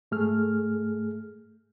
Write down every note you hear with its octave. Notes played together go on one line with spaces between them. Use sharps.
G#2 A3 G#4 F6